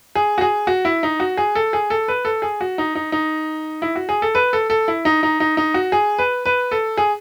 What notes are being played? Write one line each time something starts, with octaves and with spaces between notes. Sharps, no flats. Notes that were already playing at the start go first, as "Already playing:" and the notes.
G#4
F#4
G#4
F#4
E4
D#4
F#4
G#4
A4
G#4
A4
B4
A4
G#4
F#4
D#4
D#4
D#4
E4
F#4
G#4
A4
B4
A4
A4
E4
D#4
D#4
D#4
D#4
F#4
G#4
B4
B4
A4
G#4